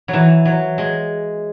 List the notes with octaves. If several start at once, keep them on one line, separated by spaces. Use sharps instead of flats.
F#3
E3
F#3
G#3